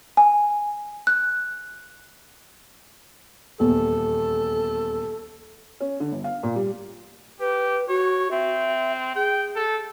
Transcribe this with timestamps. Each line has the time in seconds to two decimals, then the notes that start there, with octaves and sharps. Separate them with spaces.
0.17 G#5
1.07 F#6
3.60 D#1 E2 A4
5.80 C#4
6.00 D3
6.12 G1
6.24 F5
6.43 A#2
6.56 G3
7.40 G4 B4
7.89 F#4 C#5
8.31 C4 E5
9.16 G#4 G5
9.56 A4